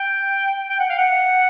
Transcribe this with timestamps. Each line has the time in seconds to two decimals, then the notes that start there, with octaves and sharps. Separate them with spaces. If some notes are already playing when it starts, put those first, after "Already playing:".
Already playing: G5
0.69 G5
0.80 F#5
0.89 F5
0.99 F#5